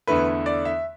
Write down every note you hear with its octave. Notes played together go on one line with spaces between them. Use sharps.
E2 D3 A3 E4 B4
D5
E5